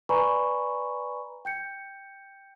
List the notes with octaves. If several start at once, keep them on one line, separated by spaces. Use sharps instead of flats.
B4 D5 G#5 A#5 B5 C#6
G5 G6 C#7